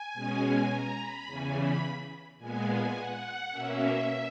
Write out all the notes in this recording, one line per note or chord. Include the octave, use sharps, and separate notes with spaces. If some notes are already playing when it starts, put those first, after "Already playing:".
Already playing: G#5
B2 G#3 C#4
A#5
B5
E2 C#3 E3 G#5
B5
A#2 G#3 B3 G#5
G#5
F#5
B2 A#3 C#4 E5